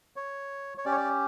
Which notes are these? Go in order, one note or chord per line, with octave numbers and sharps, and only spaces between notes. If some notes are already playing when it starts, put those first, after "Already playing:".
C#5
C#5
C#4 G4 D5
C#5
D5